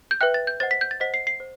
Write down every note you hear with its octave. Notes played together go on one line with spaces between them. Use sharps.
G6
B4 E5 G5 F#6
A6
G6
C5 D#5 F#5 A6
B6
G6
A6
C5 D#5 F#5 B6
C7
C7
C5